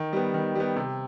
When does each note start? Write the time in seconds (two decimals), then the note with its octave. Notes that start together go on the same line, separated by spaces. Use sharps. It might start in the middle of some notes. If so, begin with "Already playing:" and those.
Already playing: D#3
0.13 G3 B3
0.34 D#3
0.55 G3 B3
0.76 C3